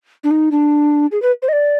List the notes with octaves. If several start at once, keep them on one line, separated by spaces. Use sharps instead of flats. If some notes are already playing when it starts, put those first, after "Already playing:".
D4
D#4
D4
G#4
B4
C5
D#5
D5